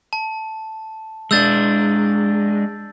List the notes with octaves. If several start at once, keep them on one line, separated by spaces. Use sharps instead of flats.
A5
G#3 D4 E6 G6 A6